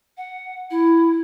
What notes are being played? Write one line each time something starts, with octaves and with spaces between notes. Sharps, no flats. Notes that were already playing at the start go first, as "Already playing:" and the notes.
F#5
E4